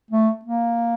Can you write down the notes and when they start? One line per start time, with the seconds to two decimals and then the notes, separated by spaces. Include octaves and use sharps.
0.11 A3
0.45 A#3